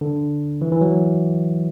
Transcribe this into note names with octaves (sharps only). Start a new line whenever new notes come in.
D3
E3
E3
F#3